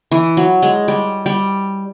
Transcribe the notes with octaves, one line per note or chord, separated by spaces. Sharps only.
E3
F#3
G#3
G3
G3